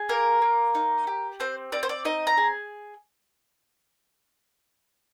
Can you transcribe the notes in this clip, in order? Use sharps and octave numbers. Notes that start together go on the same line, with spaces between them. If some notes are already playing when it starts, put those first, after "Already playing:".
Already playing: G#4
A#3 A#4
A#3
D#4
G4
C4 C5
C4 D5
C5
D5
D#4 D#5
A#5
G#4